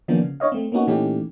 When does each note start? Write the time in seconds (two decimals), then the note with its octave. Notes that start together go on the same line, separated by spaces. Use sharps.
0.08 D#3 F3 A#3 B3 C#4 D4
0.21 C#3
0.40 D4 C#5 D#5 F5
0.52 A3 C4
0.72 A#3 B3 C#4 D#4 F#4
0.87 A#2 E3 A3 C#4 D#4 G4